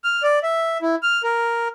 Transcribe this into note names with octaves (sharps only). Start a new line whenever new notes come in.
F6
D5
E5
E4
F6
A#4